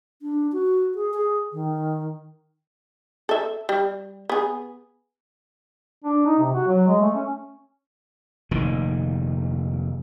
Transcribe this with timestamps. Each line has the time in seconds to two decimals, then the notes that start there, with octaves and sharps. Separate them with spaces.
0.22 D4
0.52 F#4
0.95 G#4
1.14 G#4
1.53 D#3
3.29 A4 E5
3.69 G3
4.29 B3 G#4
6.05 D4
6.26 D#4
6.39 C3
6.54 F#4
6.67 F#3
6.87 G#3
7.01 A3
7.15 C#4
8.51 F1 A#2 D#3